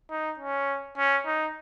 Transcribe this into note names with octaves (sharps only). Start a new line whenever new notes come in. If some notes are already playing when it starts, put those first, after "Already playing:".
D#4
C#4
C#4
D#4